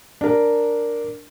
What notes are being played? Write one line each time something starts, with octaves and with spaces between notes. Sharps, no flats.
D4 A#4